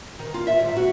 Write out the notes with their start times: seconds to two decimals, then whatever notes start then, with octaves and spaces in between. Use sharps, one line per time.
0.19 D#3
0.34 F4
0.47 E5
0.59 G#2
0.76 F#4